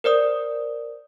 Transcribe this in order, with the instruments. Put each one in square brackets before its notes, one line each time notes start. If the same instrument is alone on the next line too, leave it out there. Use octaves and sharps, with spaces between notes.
[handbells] A#4 C5 D5 D#6